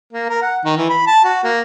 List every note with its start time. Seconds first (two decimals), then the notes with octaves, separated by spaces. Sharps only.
0.13 A#3
0.29 A#4
0.42 F#5
0.65 D#3
0.77 E3
0.90 B5
1.07 A5
1.24 F#4
1.44 A#3